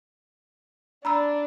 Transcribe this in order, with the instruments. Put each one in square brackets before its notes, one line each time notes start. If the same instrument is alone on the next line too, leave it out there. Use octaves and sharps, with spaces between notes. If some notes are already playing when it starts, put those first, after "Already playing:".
[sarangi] D4 [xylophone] A#5 B5 E6